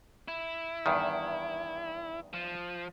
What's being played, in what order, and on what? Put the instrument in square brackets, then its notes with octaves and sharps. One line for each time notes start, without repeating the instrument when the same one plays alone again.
[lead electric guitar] E4
[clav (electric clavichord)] E2 G2 D#3
[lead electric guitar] F3